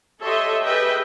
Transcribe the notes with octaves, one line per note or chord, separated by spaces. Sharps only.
G4 A4 C#5 D#5 E5 C6
G4 G#4 B4 D#5 E5 G5